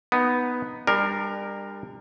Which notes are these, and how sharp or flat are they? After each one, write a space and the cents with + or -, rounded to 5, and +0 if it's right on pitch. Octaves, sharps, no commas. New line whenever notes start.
B3 +0 D#4 +0
G3 +30 D4 +30 A#4 +0